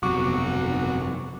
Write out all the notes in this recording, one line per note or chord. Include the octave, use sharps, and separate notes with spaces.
G1 F2 C3 F#3 B3 F#4 C#6 D6